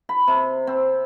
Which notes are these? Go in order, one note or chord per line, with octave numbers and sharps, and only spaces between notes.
B5
C3
C4